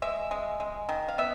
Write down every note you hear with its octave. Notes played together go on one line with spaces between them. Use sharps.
G#3 E5
G#3
G#3
D#3
F5
B3 E5